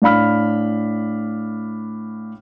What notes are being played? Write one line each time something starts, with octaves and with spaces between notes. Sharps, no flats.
A2 D4 F5 B5 F6